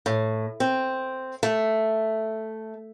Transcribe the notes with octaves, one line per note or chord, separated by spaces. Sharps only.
A2
C4
A3